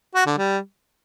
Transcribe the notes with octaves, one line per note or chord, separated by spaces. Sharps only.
F#4
D3
G3